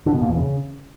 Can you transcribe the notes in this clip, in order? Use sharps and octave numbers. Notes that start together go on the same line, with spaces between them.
D3
B2
A#2
E2
C#3